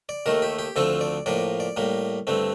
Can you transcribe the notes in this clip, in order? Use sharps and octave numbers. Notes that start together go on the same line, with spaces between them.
D5
D#2 D#3 A3 A#4
G4
G4
D2 D3 F3 A3 C4 A4
D5
A2 F3 A#3 D5
D5
A2 G3 A#3
G2 D3 A3 C4